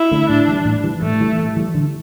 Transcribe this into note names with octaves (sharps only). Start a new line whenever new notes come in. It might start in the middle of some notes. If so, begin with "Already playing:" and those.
Already playing: E4
D3 A3 D4
A2 D4
E3 G3
A2
E3 G3
A2 A3
E3 G3
A2
E3 G3
D3